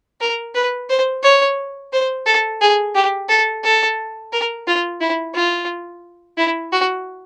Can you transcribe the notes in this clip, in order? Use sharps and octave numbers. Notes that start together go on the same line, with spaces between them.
A#4
B4
C5
C#5
C5
A4
G#4
G4
A4
A4
A#4
F4
E4
F4
E4
F#4